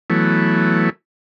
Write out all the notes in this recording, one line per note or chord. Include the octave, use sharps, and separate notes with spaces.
E3 F#3 A3 B3